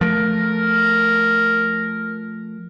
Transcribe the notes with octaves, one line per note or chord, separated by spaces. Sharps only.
F3 A3 A#4